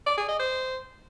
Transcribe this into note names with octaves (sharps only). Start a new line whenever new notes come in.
D5
G#4
D#5
C5